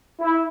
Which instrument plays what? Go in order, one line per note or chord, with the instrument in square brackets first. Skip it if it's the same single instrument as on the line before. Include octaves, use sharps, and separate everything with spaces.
[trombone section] E4